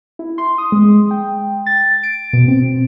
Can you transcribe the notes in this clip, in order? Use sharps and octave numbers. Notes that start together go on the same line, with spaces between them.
E4
C6
D#6
G#3
G5
A6
D7
B2
C4